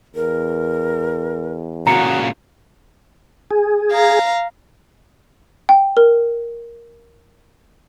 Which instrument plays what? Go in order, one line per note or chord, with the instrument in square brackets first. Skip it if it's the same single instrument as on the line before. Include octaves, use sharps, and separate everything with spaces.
[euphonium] E2 [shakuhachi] A#4
[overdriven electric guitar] A#2 C#3 [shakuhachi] F#4 [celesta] A#5 C#7
[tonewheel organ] G#4
[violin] F5 A#5
[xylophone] G5
A#4